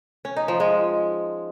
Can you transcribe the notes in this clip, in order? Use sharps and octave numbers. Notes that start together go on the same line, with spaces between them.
C#4
D#4
F3
G#3